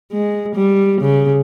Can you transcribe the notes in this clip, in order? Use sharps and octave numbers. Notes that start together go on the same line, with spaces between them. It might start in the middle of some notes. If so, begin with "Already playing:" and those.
G#3
G3
C#3